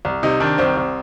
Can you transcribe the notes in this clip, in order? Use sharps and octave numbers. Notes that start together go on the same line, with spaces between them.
C2
C3 D#4
D#3 D4
C2 C4
C2